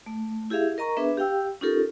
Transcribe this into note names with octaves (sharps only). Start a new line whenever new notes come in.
A3
E4 G4 G#4 E5 F5
A#4 D#5 A#5 C#6
B3 D4 G#4 B4 E5
G4 F5 G5 E6
C#4 D#4 F4 G4 A4 A#4